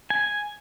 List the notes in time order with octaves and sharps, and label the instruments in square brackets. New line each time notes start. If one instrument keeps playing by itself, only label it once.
[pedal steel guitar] G#5